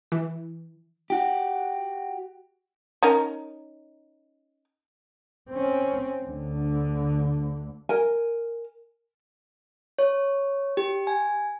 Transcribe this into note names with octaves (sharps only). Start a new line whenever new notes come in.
E3
F#4 G4
C#4 D#4 A#4
C4 C#4
D2 D3
A#4 G#5
C#5
G4
G#5